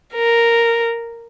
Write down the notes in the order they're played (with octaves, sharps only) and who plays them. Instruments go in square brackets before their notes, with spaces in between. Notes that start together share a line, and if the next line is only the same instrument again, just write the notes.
[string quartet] A#4